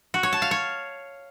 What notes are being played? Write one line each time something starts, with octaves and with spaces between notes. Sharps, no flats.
F#4
C#5
A5
F5
C#5